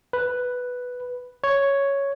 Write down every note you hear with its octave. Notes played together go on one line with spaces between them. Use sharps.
B4
C#5